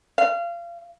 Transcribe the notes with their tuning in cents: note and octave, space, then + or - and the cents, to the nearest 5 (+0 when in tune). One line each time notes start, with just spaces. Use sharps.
F5 -30